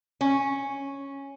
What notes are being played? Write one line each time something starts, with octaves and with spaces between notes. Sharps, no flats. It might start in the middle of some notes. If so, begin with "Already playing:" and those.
C#4